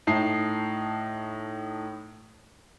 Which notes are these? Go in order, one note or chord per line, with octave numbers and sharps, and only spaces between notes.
A2 D#4 A5 C7